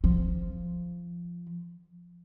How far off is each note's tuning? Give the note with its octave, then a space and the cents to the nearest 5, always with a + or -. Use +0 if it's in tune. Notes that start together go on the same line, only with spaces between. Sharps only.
F3 -10